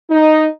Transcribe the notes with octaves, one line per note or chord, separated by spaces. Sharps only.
D#4